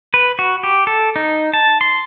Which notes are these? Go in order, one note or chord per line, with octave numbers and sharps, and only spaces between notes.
B4
F#4
G4
A4
D#4
A5
C6